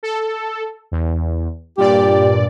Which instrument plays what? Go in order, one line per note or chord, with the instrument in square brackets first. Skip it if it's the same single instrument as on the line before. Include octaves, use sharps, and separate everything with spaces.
[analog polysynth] A4
E2
[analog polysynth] G2 A#2 D5 [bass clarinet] G4